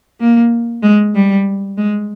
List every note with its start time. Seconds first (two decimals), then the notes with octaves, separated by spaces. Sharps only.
0.20 A#3
0.83 G#3
1.15 G3
1.78 G#3